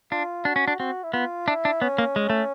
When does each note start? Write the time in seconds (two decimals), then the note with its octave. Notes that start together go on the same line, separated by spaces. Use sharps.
0.11 D4 F4
0.45 D4 F#4
0.56 C#4
0.68 D4
0.80 C4 F#4
1.04 E4
1.14 B3 F4
1.48 D4 E4
1.65 D4
1.82 B3 C#4
1.98 A#3
2.16 G#3
2.30 A3